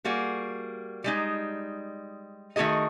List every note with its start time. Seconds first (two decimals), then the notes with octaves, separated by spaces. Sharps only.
0.05 G3 A#3 F#4 G#4
1.04 G3 G#3 D#4
2.56 D#3 A3 F#4 G#4 D#5